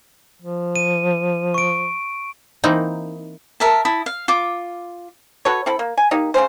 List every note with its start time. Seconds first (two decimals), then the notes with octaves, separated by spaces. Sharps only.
0.42 F3
0.76 D#7
1.54 C#6 D7
2.64 E3 A#3 C4 D#4
3.60 A#4 E5 A5
3.85 E4 A5 D#6
4.06 F5
4.28 F4 D6
5.45 F#4 A4 B4 C#5
5.66 C4 E4 A4 B5
5.79 A#3
5.97 G#5
6.11 A#3 D#4 G4
6.34 C#3 C4 C#4 C5